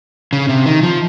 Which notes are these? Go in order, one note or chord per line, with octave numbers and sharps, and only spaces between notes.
C#3
C3
D#3
F3